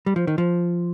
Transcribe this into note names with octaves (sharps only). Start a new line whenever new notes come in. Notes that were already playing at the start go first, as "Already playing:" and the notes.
G3
F3
D#3
F3